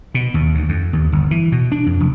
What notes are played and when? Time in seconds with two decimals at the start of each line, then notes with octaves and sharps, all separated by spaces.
0.14 B2
0.34 D#2
0.55 D2
0.69 F2
0.93 D#2
1.12 G1
1.31 E3
1.52 B2
1.72 D4
1.86 F2
2.00 F1